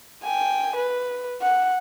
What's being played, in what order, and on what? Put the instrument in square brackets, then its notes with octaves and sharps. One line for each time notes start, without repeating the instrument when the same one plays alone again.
[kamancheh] G5 G#5
B4
F#5